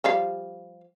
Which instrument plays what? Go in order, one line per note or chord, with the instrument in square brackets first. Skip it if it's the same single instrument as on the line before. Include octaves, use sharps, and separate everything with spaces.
[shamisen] F3 G3 F5